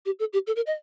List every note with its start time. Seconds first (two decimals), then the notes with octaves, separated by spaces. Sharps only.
0.06 G4
0.19 A4
0.33 G4
0.47 A4
0.56 A#4
0.67 D#5